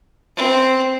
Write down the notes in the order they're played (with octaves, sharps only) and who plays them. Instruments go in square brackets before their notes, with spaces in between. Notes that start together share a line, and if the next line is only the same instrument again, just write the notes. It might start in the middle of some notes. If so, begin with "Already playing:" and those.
[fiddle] C4